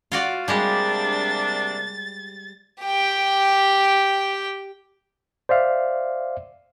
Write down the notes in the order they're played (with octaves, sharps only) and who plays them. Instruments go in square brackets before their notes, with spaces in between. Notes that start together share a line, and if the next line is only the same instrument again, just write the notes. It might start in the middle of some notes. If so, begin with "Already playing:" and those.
[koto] F4 F#4 D5
[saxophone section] C3 A#3 D4 [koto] G3 G#3 G4 [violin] A6
[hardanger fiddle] G4 G5
[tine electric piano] C5 D5 E5 F5